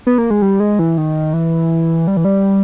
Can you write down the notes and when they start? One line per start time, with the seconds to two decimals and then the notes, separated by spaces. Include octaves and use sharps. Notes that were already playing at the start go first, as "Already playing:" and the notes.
0.07 B3
0.18 A#3
0.30 G#3
0.42 G3
0.60 G#3
0.79 E3
0.98 D#3
1.33 E3
2.07 G3
2.17 E3
2.25 G3